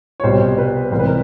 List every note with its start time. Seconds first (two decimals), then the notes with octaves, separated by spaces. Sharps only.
0.20 C#5
0.23 C2 B2 G3 C5
0.58 B4
0.92 C2 C3 E3 G#3 C5
0.99 B4
1.07 A#4